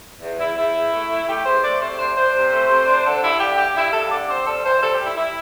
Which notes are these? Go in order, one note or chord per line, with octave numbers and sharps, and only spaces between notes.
E2
E2 E4
E2 E4
E2
A3
A3
A3 G4
E2 C5
A3 D5
C3 C5
D4 C5
D4 C5
C3
A3
C3
D4
D3 A4
G2 E4
D3 G4
G2 G4
G2 E4
G2 A4
D3 D5
C4 C5
G3 A4
E3 C5
G3 A4
G4
G3
E4
G3 E4